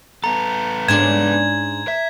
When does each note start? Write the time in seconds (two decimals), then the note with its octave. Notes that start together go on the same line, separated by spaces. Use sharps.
0.24 B3 A4 A#5
0.88 G#2 C#4 D4 G#6 E7 F#7
1.88 E5